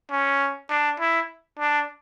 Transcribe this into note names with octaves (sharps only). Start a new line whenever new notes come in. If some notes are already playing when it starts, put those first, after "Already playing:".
C#4
D4
E4
D4